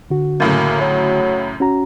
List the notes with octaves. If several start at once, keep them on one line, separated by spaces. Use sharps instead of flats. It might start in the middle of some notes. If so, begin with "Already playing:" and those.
D3 F#4
F#2 A2 C#3 A#3
F#3
C#4 F#4 A#5